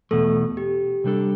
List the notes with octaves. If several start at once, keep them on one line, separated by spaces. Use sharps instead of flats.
E2 B2 A3 A4
G4
C3 G3 D4 A4